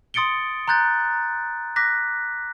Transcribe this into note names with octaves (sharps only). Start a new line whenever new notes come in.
C6 D#6 A6 C#7 D7 G7
A#5 C6 F#6 G6 A6
D6 F#6 A#6 B6